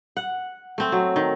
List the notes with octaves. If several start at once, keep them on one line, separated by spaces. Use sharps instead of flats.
F#5
A3 C4
F#3
D#3